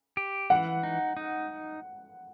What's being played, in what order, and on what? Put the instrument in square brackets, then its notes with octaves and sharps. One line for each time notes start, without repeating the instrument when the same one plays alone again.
[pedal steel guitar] G4
[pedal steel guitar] E3 [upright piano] F#5
[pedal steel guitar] D#4
D#4